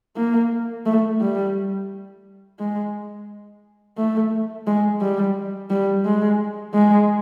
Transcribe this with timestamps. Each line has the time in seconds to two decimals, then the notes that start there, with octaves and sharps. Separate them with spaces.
0.16 A#3
0.86 A3
1.21 G3
2.59 G#3
3.98 A3
4.67 G#3
5.01 G3
5.70 G3
6.05 G#3
6.74 G#3